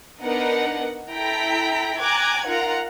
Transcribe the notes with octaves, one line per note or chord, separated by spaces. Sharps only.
B3 D4 D#4 A#4 D#5 F#5
E4 A4 G5 A#5 B6
G5 G#5 A#5 D6 F#6 G#6
D#4 F4 A#4 F#5 A#5